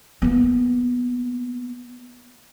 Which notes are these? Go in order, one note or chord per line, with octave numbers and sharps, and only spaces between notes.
A#3 B3